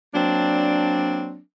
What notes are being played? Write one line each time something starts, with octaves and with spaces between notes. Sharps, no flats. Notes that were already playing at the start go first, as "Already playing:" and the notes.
F#3 A#3 C4 D4